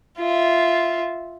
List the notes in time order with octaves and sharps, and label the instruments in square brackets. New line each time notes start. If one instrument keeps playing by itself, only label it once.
[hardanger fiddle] F4 E5